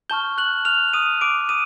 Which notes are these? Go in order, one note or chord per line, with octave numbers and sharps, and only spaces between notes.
A5 C#6 F6 G6 G7
F#6 F#7
F6 F7
D#6 D#7
D6 D7
D#6 D#7